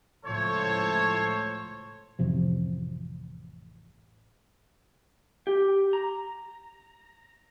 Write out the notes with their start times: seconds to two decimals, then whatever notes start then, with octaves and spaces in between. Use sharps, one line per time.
0.25 C#2 A2 F3 A4 C5 C#5
2.19 A1 F2 C3 F3
5.47 G4
5.93 A#5